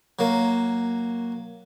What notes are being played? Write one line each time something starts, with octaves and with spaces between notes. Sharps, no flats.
F#3 A#3